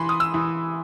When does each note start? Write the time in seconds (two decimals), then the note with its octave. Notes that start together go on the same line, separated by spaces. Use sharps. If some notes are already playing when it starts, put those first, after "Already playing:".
Already playing: E3 B5 C6
0.09 D#6
0.20 E6
0.34 E3